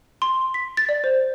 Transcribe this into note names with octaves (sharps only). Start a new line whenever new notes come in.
C6
B6
A6
D5
C5